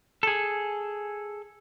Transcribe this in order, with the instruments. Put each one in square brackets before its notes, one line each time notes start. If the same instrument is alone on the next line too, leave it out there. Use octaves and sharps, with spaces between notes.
[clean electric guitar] G#4 A4